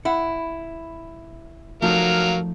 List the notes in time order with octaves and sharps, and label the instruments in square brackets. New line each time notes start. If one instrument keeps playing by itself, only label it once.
[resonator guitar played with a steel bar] E4 [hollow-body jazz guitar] F#5
[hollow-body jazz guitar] F3 A3 D#4 [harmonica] F#3 A#4 F5